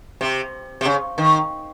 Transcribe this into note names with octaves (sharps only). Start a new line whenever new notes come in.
C3
C3
C#3
D#3